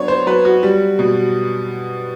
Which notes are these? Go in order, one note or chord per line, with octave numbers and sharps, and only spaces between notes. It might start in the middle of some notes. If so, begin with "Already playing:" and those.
Already playing: F#3 B3 D4 C#5
C5
F#3 B4
F#4
G3
B2